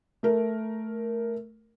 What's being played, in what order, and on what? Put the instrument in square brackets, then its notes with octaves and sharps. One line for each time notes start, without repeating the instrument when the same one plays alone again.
[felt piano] A3 A#4